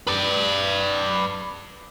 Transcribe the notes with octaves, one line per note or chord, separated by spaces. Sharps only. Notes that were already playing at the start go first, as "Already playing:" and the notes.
B4 D5